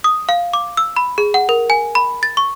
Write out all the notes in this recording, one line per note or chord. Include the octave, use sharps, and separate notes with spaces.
D#6
F5
D6
E6
B5
G#4
F#5
A#4
G#5
B5
A6
C#6